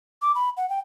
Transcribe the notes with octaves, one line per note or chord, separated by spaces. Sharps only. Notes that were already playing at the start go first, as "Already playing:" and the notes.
D6
B5
F#5
G5